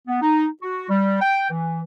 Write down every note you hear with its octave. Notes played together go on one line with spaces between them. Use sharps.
B3
D#4
F#4
G3
G5
E3